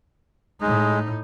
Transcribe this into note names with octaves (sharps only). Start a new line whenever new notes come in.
A2 G#3 D#4